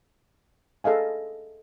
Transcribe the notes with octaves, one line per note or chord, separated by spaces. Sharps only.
G#4 A4 D#5 F5 G#5